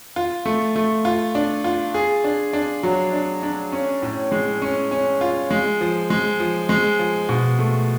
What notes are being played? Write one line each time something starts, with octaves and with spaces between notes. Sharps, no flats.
F4
A3
A3
F4
D4
F4
G#4
D4
D4
F#3
D4
D4
C#4
A2
G#3
C#4
C#4
F4
G#3
F3
G#3
F3
G#3
F3
B2
A3